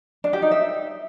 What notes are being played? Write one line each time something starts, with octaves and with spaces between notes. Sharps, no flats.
D4
G4
D#4
E5